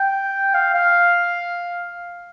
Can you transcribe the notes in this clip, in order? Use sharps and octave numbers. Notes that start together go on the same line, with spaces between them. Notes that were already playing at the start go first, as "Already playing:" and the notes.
Already playing: G5
F5
F5